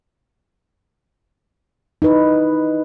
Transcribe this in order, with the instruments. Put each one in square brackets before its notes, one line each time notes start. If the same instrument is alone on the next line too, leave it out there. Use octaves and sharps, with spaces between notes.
[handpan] D#4 E4 B4